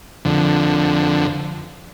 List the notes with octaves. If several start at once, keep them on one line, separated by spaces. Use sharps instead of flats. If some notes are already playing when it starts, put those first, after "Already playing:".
F2 D3